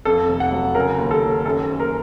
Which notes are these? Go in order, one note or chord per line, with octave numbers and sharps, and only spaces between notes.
F2 A4
F1
F#5
F#3
C#3 A#4
D#2
A4
D#2
F#2 A4
F#1
A#4